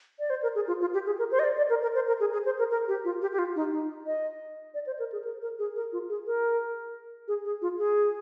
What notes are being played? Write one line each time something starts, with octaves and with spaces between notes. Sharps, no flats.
D5
C5
A#4
G#4
F4
F4
G4
G#4
A#4
C5
D#5
D5
D5
A#4
A#4
C5
A#4
G#4
G#4
C5
A#4
A#4
G4
F4
G4
G4
F4
D#4
D#4
D#5
D5
C5
A#4
G#4
A#4
A#4
G#4
A#4
F4
G#4
A#4
G#4
G#4
F4
G#4